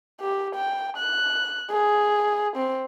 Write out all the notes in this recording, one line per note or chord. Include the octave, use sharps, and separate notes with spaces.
G4
G5
F#6
G#4
C4